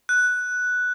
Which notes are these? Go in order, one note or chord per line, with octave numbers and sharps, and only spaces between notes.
F#6